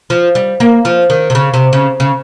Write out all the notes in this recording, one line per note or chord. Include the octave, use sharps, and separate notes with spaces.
F3
G3
A#3
F3
D#3
C3
C#3
C3
C#3
C#3